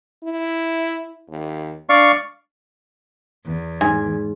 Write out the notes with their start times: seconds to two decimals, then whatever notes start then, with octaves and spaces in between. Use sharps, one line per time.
0.24 E4
1.29 D#2
1.89 D4 D5 F5 C#6
3.44 E2
3.81 G#2 G#5